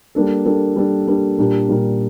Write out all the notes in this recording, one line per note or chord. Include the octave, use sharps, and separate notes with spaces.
G3 A#3 D4 A4
G3 A#3 D4 A4
G3 A#3 D4 A4
G3 A#3 D4 A4
A#2 G3 D4 G4 A#4
A#2 G3 D4 G4 A#4